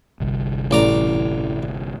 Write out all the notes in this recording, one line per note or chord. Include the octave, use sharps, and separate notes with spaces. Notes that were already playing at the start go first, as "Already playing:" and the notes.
G1 C2
A1 D5 A#5